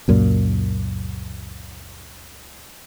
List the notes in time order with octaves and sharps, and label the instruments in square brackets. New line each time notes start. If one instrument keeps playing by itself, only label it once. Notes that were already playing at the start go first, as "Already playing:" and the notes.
[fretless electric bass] C#2 F#2 A#2